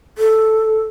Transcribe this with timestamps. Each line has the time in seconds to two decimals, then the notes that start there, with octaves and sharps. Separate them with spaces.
0.18 A4